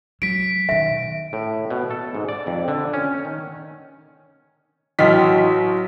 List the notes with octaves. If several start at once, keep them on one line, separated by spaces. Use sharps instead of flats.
F#3 B6 D7
B2 D#3 E5
A2
B2
A4
G#2
D5
F2
D3
C#4
D#3
A1 F#3 E4 D#5 G5 F6 B6